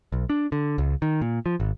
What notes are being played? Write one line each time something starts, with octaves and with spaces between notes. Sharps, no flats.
B1
D4
D3
C#2
D#3
A#2
F3
G#1